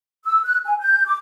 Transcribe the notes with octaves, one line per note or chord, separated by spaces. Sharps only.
E6
F#6
G#5
G6
D6